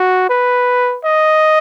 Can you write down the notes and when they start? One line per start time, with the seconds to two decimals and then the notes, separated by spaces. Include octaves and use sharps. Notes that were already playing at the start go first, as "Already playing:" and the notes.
Already playing: F#4
0.30 B4
1.05 D#5